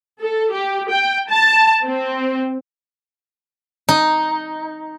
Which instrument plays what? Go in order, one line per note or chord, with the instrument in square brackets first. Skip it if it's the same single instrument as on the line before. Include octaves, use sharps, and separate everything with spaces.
[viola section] A4
G4
G5
A5
C4
[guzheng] D#4